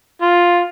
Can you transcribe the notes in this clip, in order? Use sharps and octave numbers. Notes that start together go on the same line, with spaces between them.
F4